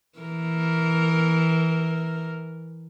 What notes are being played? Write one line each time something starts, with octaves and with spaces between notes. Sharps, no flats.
E3 A#4